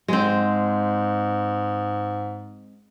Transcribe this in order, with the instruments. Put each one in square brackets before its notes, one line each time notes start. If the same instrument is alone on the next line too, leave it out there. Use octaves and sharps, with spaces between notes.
[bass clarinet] G#2 [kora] G#3 C4